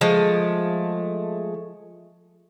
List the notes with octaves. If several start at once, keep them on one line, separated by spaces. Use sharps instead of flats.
F3 G#3 A3